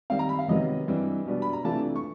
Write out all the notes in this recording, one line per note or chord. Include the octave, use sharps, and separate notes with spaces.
D#3 G3 C4 F5
A#5
B5
F5
C3 D#3 F#3 B3 D#5
G2 E3 G3 C4
B2 G3 B3 D4
B5
A#5
C3 E3 A3 D4 F4 A5
C#6